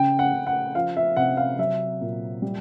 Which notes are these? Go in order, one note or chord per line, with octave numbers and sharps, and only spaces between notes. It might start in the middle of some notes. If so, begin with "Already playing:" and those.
Already playing: C#3 G5
F#5
C#3
F#5
F3 F5
E5
C3 F#5
F5
F#3 E5
A#2
G3